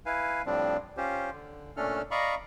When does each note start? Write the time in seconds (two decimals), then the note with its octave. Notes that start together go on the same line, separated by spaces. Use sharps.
0.06 E4 B4 F5 G#5
0.46 A2 F3 G3 C4 D4
0.97 C#4 F4 G4 C5
1.32 D3
1.77 A#2 A3 C#4 D4 A4 F6
2.11 D5 D#5 F5 A#5 B5 C#6